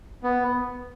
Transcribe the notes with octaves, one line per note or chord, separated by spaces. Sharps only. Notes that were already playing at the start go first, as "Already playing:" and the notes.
B3